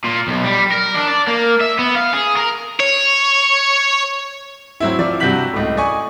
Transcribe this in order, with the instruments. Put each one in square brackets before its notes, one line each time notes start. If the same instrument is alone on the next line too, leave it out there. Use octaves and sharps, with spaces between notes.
[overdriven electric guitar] A#2
B1
G3
A#4
D4
D5
A#3
E5
B3
F5
G#4
A#4
[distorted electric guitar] C#5
[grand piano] F#3 C4 E4
F3 D5
G2 C3 F#4 G6 B6 F#7
C#2 A2
D5 D#5 G#5 C#6